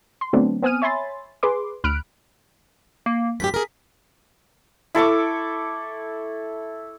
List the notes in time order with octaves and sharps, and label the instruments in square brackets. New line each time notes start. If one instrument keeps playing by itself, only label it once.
[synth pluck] C6
D3 F#3 A3 B3 C4 D4
B3 C4 G#5 D#6 F6 D#7
C#5 E5 G#5 B5 C6 A6
G#4 B4 C6 D6
D2 B5 F6 F#6 D7
[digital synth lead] A#3
[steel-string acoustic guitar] F#2 A2 G4 [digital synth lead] B6
[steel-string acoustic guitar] G#4 A#4
[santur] E4 A4 C#6 D6